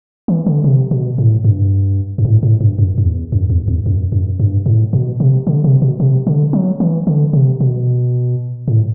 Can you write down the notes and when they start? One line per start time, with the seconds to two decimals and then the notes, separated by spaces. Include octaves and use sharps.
0.28 E3
0.46 D3
0.64 C3
0.91 B2
1.18 A2
1.44 G2
2.18 G2
2.25 A2
2.43 A2
2.60 G2
2.78 F#2
2.98 F#2
3.06 E2
3.32 F#2
3.50 E2
3.68 E2
3.86 F#2
4.12 F#2
4.40 G2
4.66 A2
4.93 B2
5.20 C3
5.47 D3
5.64 C3
5.82 B2
6.00 C3
6.27 D3
6.53 F#3
6.80 E3
7.07 D3
7.33 C3
7.61 B2
8.68 A2